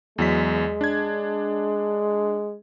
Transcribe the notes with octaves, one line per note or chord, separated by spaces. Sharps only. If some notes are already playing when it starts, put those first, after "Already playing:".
E2 F#3 G#3 B6
D4 G#6